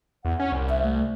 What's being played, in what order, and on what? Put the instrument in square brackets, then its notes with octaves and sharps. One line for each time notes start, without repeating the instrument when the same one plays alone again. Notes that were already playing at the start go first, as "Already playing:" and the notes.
[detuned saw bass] E2 [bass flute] F#5
[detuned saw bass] C#4
C2
[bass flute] E5
A3